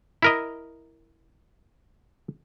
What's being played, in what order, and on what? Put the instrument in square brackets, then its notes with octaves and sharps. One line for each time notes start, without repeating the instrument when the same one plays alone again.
[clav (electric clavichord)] E4 A#4 D#5